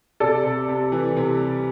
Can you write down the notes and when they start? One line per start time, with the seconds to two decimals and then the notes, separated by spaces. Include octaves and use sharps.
0.20 C3 A4 D5
0.44 C3
0.68 C3
0.92 E3
1.17 C3
1.40 G3